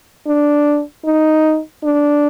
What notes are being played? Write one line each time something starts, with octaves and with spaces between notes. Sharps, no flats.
D4
D#4
D4